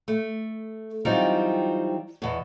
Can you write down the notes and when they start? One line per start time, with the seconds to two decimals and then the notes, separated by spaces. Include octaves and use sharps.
0.08 A3
1.05 E3 F#3 G3 C4 D#4 F4
2.22 E2 B2